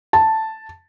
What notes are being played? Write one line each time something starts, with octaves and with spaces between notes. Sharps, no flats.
A5